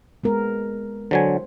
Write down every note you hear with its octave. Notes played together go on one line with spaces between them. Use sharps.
G#3 B3 A#4
D3 F#3 C5 G#5